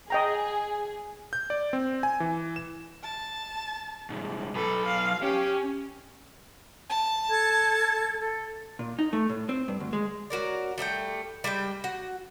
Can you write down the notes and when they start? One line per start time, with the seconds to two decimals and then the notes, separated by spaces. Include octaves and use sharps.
0.10 G#4 D#5 G5 A#5
1.33 G6
1.50 D5
1.73 C4
2.03 G#5
2.20 E3
2.56 E7
3.03 A5
4.10 C2 G#2
4.55 F#3 A4 B4
4.86 F5
5.23 C#4 G4
6.90 A5
7.31 A4 G#6
8.19 A4
8.79 A#2
8.99 D#4
9.13 A3
9.29 A2
9.49 C4
9.68 G2
9.80 D2
9.93 G#3
10.30 C#4 F#4 A#4 D5
10.78 G3 A3 D#5 G5
11.44 G3 G#3 E5 G5
11.84 F#4